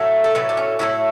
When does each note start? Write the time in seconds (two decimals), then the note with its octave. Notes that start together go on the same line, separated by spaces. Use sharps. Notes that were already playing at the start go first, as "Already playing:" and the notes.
Already playing: A2 F#3 A3
0.24 A4
0.35 A2 F#3 A3 B4
0.49 D4
0.57 C#4
0.79 A2 F#3 A3 E4